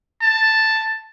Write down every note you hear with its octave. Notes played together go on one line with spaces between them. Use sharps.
A5